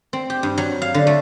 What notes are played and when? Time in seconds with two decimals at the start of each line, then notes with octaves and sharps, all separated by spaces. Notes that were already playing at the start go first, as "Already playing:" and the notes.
0.13 C4
0.30 G4
0.43 G2
0.58 F#3
0.82 F5
0.94 D3
1.07 A3